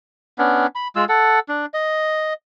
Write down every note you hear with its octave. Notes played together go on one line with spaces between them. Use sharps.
B3 C#4 D4
B5
G#3 F4 E6
A4 F#5
D4
D#5